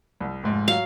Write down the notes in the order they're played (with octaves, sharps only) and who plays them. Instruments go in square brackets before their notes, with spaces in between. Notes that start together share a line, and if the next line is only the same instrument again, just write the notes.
[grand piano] C2
F1 G#2
[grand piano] F#3 [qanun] F5